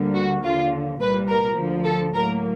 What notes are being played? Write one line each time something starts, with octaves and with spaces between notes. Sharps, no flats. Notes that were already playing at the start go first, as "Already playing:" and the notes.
Already playing: D2 D3 G3 A#3
F#4
D#2 D3 F3 F4
C2 A#2 G3 A#3 B4
A#4
D2 D3 F3
A4
A2 F#3 A#3 A#4